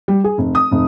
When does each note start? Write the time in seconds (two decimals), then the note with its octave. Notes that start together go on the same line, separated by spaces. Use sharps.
0.08 G3
0.24 G#4
0.38 F1
0.55 D#6
0.72 F1